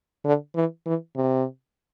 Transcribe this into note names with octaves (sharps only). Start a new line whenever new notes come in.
D3
E3
E3
C3